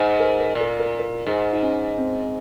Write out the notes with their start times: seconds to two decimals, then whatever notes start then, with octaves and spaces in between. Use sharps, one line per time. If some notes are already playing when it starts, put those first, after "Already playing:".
Already playing: G#2 G#4
0.20 A#4
0.40 A#4
0.55 A#2
0.60 A#4
0.80 A#4
0.99 A#4
1.27 G#2 G#4
1.53 D#4
1.62 C#4
1.98 C4